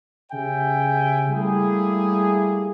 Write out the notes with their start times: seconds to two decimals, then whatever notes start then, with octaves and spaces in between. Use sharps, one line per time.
0.31 C#3 G4 E5 G5 G#5
1.30 G3 A3 A#3 E4 G4 G#4